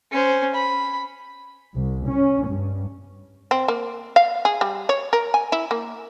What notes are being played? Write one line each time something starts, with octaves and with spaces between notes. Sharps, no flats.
C#4 C5
B5
C2
C#4
G2
C4
A#3
F5
G#4
G3
C#5
A#4
G#5
E4
A#3